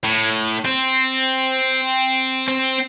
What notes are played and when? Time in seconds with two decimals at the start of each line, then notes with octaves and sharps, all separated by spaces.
0.04 A2
0.65 C4
2.48 C4